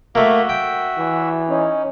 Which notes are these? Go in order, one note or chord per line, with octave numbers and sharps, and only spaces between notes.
A3 A#3 F#4 E5
G5
E3
C#4 D#4